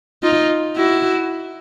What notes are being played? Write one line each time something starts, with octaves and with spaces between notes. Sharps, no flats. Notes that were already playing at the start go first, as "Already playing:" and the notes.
D#4 F4
E4 F#4